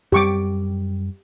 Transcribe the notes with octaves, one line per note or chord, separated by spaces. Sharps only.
F#2 G3 G4 C#6 D6